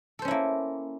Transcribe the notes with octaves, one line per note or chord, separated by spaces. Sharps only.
A#3 C#4 E4 A4 C5